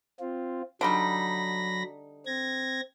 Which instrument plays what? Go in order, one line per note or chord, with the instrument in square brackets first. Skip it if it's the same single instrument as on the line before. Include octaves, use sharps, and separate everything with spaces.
[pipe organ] C4 F4
[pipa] D3 G3 D#4 [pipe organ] F#3 B5 A#6
[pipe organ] C4 G#6 A#6